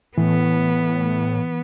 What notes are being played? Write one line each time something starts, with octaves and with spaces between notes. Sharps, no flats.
A2 E3 B3